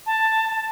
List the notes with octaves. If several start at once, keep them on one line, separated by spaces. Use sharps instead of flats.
A5